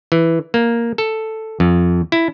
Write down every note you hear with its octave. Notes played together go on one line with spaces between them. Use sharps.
E3
A#3
A4
F2
E4